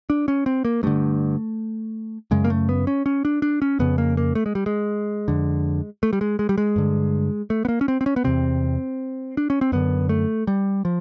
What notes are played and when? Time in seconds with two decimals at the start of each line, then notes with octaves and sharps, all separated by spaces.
0.10 D4
0.28 C#4
0.46 C4
0.65 A#3
0.83 G2 D3 A3
2.31 F#2 C#3 G#3
2.44 A#3
2.50 A3
2.69 B3
2.87 C#4
3.06 C#4
3.25 D4
3.42 D4
3.62 C#4
3.79 F2 C#3 B3
3.98 A#3
4.17 A#3
4.35 A3
4.46 G#3
4.55 G3
4.66 G#3
5.28 F2 D3
6.03 A3
6.13 G3
6.21 G#3
6.39 G#3
6.49 G3
6.58 G#3
6.76 G2 D3
7.50 A3
7.65 B3
7.68 A#3
7.81 C#4
7.88 C4
8.01 C4
8.06 C#4
8.16 B3
8.24 E2 C3 C4
9.37 D4
9.50 C#4
9.61 C4
9.72 F#2 D3 B3
10.09 A3
10.47 G3
10.85 F3